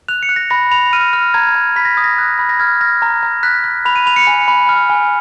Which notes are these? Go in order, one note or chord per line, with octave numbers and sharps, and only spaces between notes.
F#6 F7
C#7
F#6
A#6
B5 A#6
B5 F7
F6 D#7
F6
A#5 G#6
A#5
B5 B6
A#6
D#6 G#6
A#6
F#6
B5
A#6
F6 G#6
F6 A#6
A#5
A#5
F#6 B6
F#6
B5 F7
D#7
B5 F7
C#7
G#5
B5
F6
G#5